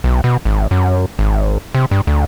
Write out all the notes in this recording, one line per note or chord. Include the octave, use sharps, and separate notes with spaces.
B1
B2
G#1
F#2
G#1
C3
G2
D2